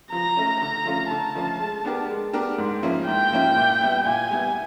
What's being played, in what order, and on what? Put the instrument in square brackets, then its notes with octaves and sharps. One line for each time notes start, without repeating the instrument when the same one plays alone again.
[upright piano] F3 [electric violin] A#5
[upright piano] A3 C#4
[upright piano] D3 [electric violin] A#5
[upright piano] F3 A3 C#4 F4
[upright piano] D3 [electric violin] A5
[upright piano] F3 A3 C#4 F4
G#3
B3 D4 G4 A#4
G#3
B3 D4 G4 A#4
G#2
F3 A#3 C#4 E4
[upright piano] G#2 [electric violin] G5
[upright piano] F3 A#3 C#4 E4
A#2
G3 B3 E4
[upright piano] A#2 [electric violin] G#5
[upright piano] G3 B3 E4